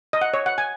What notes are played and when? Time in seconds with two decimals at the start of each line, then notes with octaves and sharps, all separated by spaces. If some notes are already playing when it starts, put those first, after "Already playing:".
0.13 D#5
0.22 F#5
0.34 C#5
0.46 F#5
0.58 G#5